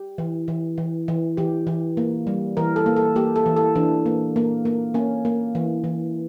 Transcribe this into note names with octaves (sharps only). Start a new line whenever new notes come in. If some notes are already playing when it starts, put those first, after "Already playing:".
Already playing: G4
E3
E3
E3
E3
E3 G4
E3
A#3
G3
E3 A#4
A4
A#3
A4
A#3 G4
A4
E3
A4
E3 D4
A#3
A#3
A#3
A#3 C#4
A#3
E3
E3